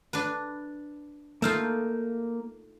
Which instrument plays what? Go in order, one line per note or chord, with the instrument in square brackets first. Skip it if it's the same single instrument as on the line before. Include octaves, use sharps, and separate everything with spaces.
[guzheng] D4 B4
[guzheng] A3 D#4 F4 [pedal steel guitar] A#3 F6 G6